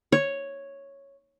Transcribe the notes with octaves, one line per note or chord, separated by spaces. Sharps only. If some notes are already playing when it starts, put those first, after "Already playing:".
C#5